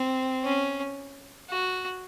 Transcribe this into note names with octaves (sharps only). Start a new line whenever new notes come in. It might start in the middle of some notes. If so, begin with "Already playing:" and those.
Already playing: C4
C#4
F#4